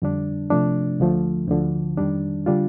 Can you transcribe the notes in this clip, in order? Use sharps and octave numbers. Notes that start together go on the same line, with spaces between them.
F2 D3 G3 D4
C3 F3 A3 D4
D2 D3 F3 A3
D2 D3 F3
F2 D#3 G3 D4
D3 G3 D4 F4